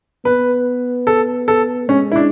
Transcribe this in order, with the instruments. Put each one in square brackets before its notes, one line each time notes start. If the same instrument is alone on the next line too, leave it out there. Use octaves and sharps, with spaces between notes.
[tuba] B3 [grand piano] B4
[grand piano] A4
A4
[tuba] G#3 [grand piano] C#4
[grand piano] E4
D4